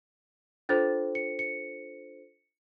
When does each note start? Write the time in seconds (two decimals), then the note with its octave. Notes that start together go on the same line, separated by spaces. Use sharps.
0.69 D4 F4 A4 C5 A6
1.15 C#7
1.39 C#7